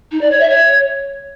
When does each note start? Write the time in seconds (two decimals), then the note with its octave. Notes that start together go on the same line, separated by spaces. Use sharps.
0.11 D#4
0.21 D5
0.30 C#5
0.40 E5
0.50 C#5